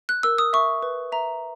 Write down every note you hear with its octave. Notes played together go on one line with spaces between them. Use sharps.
F#6
A#4 E6
D#6
E5 C#6
B4
E5 A#5